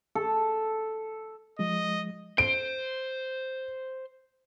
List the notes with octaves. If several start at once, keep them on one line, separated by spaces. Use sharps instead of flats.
A4
F3 G#3 D#5
C5 D7